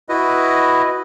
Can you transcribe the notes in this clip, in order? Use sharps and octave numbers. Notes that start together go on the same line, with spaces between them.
E4 F#4 B4 D#5